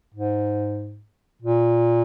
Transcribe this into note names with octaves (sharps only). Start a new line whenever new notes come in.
G#2
A#2